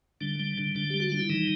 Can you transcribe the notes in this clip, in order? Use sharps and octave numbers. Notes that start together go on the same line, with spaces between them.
D3 G3 D4
G3
D3
D3 D4
G3 G4
F#4
G3 F4
E4
D#3 E3 D#4